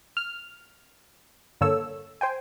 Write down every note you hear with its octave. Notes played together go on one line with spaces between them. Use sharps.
F6
G2 D3 A#3 A4 C#5 E6
C5 G5 G#5